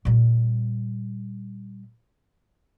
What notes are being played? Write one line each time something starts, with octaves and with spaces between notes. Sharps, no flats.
A#2 G3